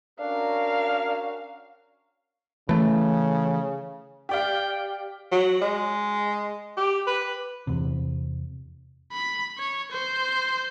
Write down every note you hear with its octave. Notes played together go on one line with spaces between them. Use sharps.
C#4 D4 F#4 A#4 F5
C#3 E3 A3
G4 D5 F5 G5
F#3
G#3
G4
B4
E2 C3
B5
C#5
C5